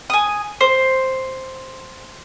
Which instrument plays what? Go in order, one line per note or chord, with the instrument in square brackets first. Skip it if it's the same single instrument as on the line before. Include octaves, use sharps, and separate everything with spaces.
[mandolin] G#5 D#6
C5